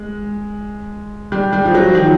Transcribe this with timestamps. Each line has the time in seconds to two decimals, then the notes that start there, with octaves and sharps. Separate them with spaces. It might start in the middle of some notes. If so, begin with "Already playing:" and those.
Already playing: G#3
1.32 G3
1.53 G3
1.65 F3
1.74 F#3
1.95 D#3